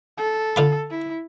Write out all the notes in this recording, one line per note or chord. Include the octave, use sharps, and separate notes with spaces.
A4
D3 F4 B5
E4